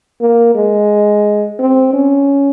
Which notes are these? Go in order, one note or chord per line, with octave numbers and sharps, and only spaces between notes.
A#3
G#3
C4
C#4